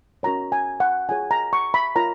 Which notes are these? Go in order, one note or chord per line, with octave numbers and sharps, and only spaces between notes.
C#4 F#4 A#4 C#5 A#5
G#5
F#5
F4 G#4 C#5 G#5
A#5
C#6
B5
F4 A#4 C#5 A#5